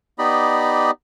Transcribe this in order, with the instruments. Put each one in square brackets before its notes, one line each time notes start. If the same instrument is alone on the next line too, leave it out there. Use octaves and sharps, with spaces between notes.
[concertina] B3 D#4 G4 D5 D#5 B5